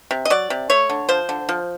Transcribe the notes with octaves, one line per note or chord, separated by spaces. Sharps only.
C3
D#5
F#3 D5
C3
A3 C#5
D3
F3 C5
D3
F3